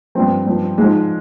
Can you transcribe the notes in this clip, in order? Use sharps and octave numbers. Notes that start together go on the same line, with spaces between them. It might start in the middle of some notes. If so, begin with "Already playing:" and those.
G2 F3 C4
G2 F3
G#2 F3 G#3